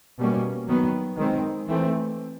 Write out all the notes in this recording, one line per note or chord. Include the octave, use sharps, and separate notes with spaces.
B2 G3 A#3 C#4
D#3 F#3 B3
D#3 G#3 C4
E3 A3 C4